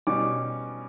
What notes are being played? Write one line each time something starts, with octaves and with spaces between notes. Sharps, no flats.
B2 G3 C#4 D6